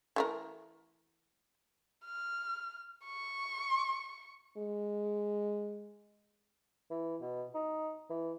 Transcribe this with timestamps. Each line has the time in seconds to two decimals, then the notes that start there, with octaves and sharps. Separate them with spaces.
0.16 E3 A3 A#4
2.05 F6
3.06 C#6
4.58 G#3
6.91 E3
7.22 B2
7.55 D#4
8.10 E3